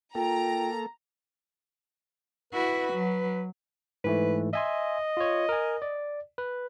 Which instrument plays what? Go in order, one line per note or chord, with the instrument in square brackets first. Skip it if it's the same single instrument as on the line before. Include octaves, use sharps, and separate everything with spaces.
[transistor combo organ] A#3 A4 [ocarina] F4 [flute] G5 [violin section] A#5
[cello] E4 F#4 [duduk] B4
[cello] F#3
[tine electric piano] G#2 E3 A3 [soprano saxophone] B4
[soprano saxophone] D#5 [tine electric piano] E5 G#5 C6
[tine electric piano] F4 C#5
A#4 G#5
D5
B4